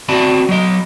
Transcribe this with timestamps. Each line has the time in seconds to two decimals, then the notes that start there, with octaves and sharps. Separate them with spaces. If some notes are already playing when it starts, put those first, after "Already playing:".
0.09 C4 F#4 D5 A5 B5
0.49 F#3 D#5